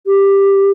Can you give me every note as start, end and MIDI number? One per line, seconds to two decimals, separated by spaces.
0.07 0.71 67